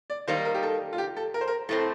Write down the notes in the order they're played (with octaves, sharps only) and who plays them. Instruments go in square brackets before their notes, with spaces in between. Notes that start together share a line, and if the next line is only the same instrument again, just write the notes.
[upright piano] D5
[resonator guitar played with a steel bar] D#3 G3 A#3 D#4 [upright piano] C5
[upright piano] A#4
G4
A4
F4
G4
A4
A#4
C5
A#4
[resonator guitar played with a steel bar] A2 A3 C4 [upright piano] A4